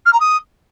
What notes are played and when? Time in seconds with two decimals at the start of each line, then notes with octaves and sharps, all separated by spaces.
0.06 F6
0.13 A#5
0.20 D#6